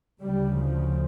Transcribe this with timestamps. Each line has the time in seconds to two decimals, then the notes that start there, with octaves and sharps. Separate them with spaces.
0.21 D2 C#3 G3
0.59 F3